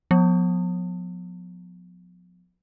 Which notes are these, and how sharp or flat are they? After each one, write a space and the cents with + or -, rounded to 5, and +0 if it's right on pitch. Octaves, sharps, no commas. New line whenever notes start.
F3 +40 B3 +0